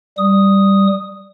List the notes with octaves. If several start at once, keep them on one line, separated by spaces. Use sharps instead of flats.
G3 D#6